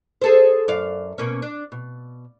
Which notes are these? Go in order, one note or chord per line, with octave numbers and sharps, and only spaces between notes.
G#4 A4 C5
F#2 D5 F5
B2 A#3 C#4
D4
B2